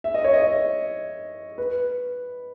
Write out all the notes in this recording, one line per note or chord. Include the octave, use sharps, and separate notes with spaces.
E5
D#5
C#5
D#5
B4